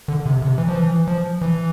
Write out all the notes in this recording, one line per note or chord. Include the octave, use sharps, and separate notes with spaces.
D3
C3
C3
E3
F3
E3
F3
E3